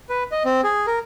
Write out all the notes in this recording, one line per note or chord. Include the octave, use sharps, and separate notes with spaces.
B4
D#5
C4
G#4
A#4